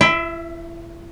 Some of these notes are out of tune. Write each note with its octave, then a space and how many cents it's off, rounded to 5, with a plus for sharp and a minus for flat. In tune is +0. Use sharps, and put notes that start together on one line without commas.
E4 +40 E5 +0